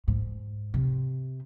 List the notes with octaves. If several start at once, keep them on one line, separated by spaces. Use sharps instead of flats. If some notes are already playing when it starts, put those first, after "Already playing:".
G#2
C3